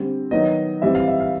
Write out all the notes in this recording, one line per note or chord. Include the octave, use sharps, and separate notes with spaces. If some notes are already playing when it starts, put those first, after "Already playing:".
Already playing: D3 G3 C4
D#3 F#3 B3 D#5
E3 G3 C4 E5
F5
E5
F5